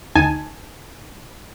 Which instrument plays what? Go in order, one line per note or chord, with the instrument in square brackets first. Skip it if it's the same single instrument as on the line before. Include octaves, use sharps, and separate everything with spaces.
[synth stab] D2 D#4 G#5 A5